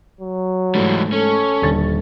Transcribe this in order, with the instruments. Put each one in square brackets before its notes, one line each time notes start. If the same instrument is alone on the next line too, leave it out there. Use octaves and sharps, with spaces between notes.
[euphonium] F#3
[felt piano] G#2 A3 [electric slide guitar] E3 G3
[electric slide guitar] C#4 [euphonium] A4
[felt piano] D#1 D3 A6